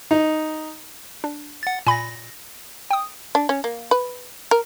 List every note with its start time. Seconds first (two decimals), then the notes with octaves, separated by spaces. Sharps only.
0.11 D#4
1.24 D4
1.63 F#5 A6
1.87 A#2 G#5 B5 A#6
2.91 G5 D#6
3.35 D4
3.49 C#4
3.64 A#3
3.91 B4
4.51 A#4